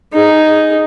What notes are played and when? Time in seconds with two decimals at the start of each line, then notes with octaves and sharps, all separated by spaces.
0.13 D#4 G#4